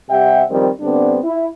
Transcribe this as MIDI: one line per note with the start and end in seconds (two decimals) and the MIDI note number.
0.11 0.43 48
0.11 0.43 55
0.11 0.43 76
0.11 0.43 78
0.11 0.43 79
0.50 0.69 51
0.50 0.69 53
0.50 0.69 55
0.50 0.69 60
0.81 1.19 50
0.81 1.19 55
0.81 1.19 59
0.81 1.19 60
0.81 1.19 62
1.24 1.46 64